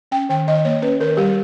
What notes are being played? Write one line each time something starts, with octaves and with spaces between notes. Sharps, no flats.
C#4 G5
D#3 G5
D#3 D#5
A#3 C#5
C#4 B4
D#3 A#4
G3 G4